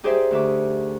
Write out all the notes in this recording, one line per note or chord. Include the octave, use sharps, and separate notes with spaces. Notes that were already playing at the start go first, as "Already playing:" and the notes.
D#4 G4 G#4 C5 D5 E5
D2 E5 D6